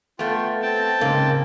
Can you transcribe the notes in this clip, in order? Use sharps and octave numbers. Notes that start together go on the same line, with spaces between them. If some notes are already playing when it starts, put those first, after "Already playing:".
A3 B3 F4 G5
C4 G5 A5
G#2 C#3 A#3